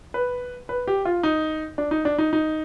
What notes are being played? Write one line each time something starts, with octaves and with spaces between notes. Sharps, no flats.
B4
B4
G4
F4
D#4
D4
D#4
D4
D#4
D#4